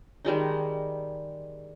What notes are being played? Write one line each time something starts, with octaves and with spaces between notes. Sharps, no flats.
D#3 G3 G#3 D#4